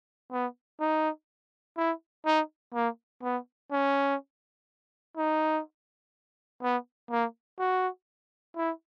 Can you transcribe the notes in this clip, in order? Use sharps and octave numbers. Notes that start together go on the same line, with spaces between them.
B3
D#4
E4
D#4
A#3
B3
C#4
D#4
B3
A#3
F#4
E4